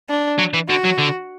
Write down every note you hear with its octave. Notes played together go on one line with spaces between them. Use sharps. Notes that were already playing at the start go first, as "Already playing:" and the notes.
D4
F#3
E3
D3 F#4
F#3
D3